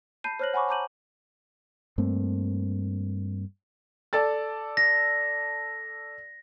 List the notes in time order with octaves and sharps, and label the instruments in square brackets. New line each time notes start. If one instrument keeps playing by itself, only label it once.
[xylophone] A5 B5 G6 C7 D#7
C5 C#5 F6 F#6 A#6 F#7
F#5 G#5 B5 C#6 D6
A5 A#5 D6 G6 D#7 F#7
[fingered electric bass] G2 A3 A#3 C4
[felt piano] A4 D5 A6
[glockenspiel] A#6